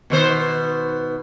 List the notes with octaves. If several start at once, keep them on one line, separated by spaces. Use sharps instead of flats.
B2 D#3 C5